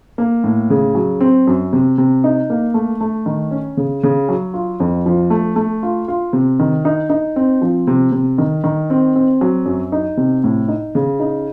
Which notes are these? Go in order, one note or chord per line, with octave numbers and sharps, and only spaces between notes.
A#3
A2
C#3
F#3
C4
F#2
C3
C3
D#4
A#3
A3
A3
D#3
C#4
C#3
C#3
F#3
F4
F2
F3
A3
A3
F4
F4
C3
D#3
D#4
D#4
C4
F3
C3
C3
D#3
D#3
C4
C4
F#3
F#2
D#4
C3
A2
D#4
C#3
D#4